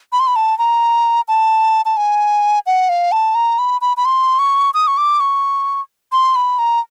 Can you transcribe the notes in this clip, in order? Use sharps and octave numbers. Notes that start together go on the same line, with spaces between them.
B5
C6
B5
A5
A#5
A5
A5
G#5
F#5
F5
A5
A#5
B5
B5
B5
C6
C#6
D#6
C#6
D6
C#6
C6
B5
A#5